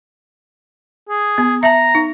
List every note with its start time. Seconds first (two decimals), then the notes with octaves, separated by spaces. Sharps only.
1.09 G#4
1.38 B3
1.63 E5 A5 A#5
1.95 D#4